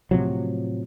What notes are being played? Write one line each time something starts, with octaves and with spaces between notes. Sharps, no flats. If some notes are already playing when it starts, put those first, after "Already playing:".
A2 C3 F3 F#3